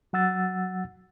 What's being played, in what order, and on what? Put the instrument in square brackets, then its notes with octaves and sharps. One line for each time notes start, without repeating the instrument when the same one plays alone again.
[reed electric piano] F#3 F#5 E6 A6